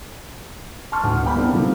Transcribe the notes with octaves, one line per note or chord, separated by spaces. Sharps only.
A5 C6 C#6 F6
D2
G2 A#3 B3 G5 B5
A#3 C4 D4
D3 D#3 F3 G3 A#3 C4